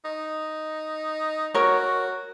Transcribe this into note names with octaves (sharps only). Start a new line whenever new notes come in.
D#4
F#4 A#4 C#5